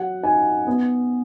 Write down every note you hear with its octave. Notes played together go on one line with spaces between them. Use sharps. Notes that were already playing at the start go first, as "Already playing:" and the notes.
Already playing: F#3 F#5
D#4 G#5
B3